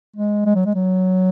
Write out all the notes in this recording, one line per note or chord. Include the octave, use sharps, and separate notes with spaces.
G#3
G#3
F#3
G#3
F#3